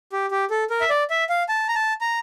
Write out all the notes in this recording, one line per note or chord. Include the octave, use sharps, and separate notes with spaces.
G4
G4
A4
A#4
E5
D5
E5
F5
A5
A#5
A5
A#5